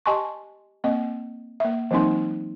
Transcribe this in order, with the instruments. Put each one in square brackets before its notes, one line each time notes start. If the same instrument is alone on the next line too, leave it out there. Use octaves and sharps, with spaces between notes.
[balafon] G4 D#5 G#5 A5 C6 C#6
A#3 C4 D#5
A#3 E5
E3 F#3 A#3 C4 D#4 C6